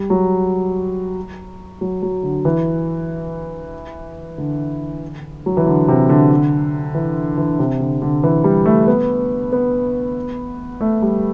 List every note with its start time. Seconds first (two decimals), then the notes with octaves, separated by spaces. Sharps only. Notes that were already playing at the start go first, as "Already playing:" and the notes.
Already playing: G3
0.10 F#3
1.81 F#3
2.02 F#3
2.23 D3
2.45 E3
4.38 D3
5.46 F#3
5.57 E3
5.66 D3
5.88 C3
6.09 D3
6.95 E3
7.38 E3
7.59 C3
7.80 D3
8.02 D3
8.24 E3
8.44 G3
8.66 A3
8.88 B3
9.52 B3
10.81 A3
11.02 G3